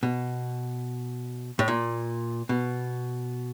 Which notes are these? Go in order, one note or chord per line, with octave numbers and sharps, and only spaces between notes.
B2
A2
A#2
B2